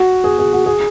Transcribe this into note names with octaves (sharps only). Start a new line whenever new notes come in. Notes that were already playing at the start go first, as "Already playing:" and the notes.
Already playing: F#4
G#4
G#4
F#4
G#4